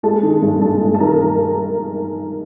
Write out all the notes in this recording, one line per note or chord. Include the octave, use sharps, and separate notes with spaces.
G#3 A4 A5
D#3
G2
G2 A4 A5
G#3
A5
D#3 A#4 A#5